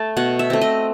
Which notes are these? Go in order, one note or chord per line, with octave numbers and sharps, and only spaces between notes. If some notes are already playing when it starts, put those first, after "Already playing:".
Already playing: A3 A5
B2 F#5
E5
A3 C4
D#5